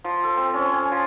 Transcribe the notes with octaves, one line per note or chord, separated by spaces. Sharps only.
F3
A4
C4
C#4
G#5
F3